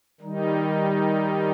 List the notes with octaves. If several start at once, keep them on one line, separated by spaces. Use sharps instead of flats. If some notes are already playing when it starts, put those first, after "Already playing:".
D#3 G3 D#4